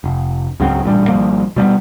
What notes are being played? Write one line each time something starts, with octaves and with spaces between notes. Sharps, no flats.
F1
C#2 G#2 F#3 C4
A1 G2 A#2 G3
G#1 F3 G3 A#3
B2 G3 A3 B3